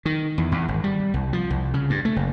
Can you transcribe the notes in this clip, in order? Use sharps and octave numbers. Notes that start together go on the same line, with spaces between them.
D#3
E2
E2
G#1
G3
C2
F3
C2
C#3
G2
A3
F#1